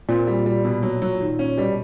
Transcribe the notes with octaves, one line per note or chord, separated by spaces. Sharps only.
A#2 C4
G3
G3
B2
F#3
F#3
D#3
C#4
B2 G3